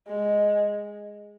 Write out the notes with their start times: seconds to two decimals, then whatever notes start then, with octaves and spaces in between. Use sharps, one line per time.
0.09 G#3